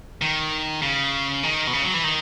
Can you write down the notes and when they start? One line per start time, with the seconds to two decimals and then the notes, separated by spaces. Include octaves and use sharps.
0.22 D#3
0.82 C#3
1.43 D#3
1.67 B2
1.73 C#3
1.83 F#3
1.94 E3
2.04 D#3